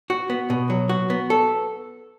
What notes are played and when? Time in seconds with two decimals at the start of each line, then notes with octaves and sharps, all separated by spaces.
0.10 F#4
0.30 B3
0.50 B2
0.70 F#3
0.89 F#4
1.10 B3
1.30 A4